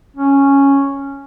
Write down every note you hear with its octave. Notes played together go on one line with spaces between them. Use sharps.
C#4